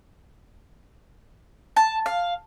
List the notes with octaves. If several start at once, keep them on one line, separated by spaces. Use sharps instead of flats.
A5
F5